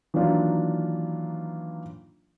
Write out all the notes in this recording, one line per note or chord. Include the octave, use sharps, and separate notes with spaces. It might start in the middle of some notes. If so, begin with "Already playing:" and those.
D#3 E3 F#3 A#3 D4 F4